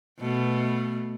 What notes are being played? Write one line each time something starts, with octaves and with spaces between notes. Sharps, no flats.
B2 A3